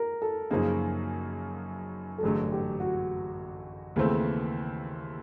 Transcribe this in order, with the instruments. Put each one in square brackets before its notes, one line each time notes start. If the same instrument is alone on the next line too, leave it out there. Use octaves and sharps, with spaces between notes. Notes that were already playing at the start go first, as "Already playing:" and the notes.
Already playing: [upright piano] A#4
A4
[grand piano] F#2 C#3 F3 A#3 D#4 [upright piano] G#4
[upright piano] A4
[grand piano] A1 G2 D3 F#3 A3 [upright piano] G#4
[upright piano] G4
F#4
[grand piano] D#2 C#3 E3 A3 C4